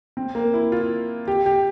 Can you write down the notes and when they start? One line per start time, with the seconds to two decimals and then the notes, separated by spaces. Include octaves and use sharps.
0.17 C4
0.35 A#3
0.54 E4
0.72 F4
1.28 G4
1.46 G4